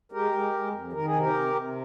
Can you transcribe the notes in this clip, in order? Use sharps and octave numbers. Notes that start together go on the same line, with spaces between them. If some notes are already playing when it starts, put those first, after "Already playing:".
G#3 G4 A#4
G#3
G#3
F2
D#3 A#4
G#4
C3
G4 A#4
C3
C3